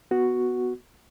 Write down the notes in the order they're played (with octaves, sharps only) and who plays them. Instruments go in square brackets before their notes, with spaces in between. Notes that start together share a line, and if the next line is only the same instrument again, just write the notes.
[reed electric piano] B3 F#4